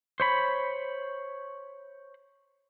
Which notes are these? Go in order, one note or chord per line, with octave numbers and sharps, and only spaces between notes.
C5 C#5 B5